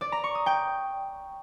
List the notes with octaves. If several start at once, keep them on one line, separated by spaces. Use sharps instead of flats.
D5
A#5
C#6
D#6
G5